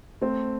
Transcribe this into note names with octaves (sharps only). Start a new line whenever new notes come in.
A3 C4